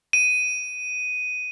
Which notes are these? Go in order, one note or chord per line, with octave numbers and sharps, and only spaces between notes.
D#7